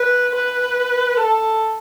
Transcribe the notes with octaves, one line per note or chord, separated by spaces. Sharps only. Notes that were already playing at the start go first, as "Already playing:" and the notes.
Already playing: B4
B4
A4